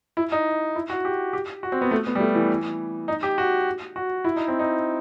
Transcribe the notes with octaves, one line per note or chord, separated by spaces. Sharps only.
E4
D#4
E4
F#4
G4
G4
F#4
C4
B3
A3
B3
G3
A3
E3
D#4
G4
F#4
F#4
E4
D#4
C4
D#4